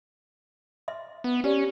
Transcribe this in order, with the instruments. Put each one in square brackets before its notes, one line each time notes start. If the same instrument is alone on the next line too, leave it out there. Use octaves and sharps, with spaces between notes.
[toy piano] D#5 E5 C6
[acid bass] B3
[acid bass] C#4 [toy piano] G4 D5